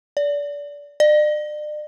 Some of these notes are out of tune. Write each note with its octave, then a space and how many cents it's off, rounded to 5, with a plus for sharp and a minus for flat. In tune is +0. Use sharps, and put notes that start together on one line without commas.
D5 -25
D5 +40